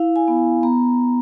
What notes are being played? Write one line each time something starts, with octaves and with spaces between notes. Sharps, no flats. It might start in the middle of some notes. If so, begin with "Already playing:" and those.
Already playing: E4 F5
G#5
B3
B3 A#5